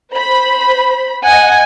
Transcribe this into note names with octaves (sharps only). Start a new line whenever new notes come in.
C5 B5
D#5 F#5 G#5